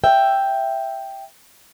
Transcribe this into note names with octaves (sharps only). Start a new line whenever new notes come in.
E5 G5